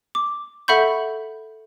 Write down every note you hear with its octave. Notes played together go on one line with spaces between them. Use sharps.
D6
A4 E5 F#5 B5 C#6 G6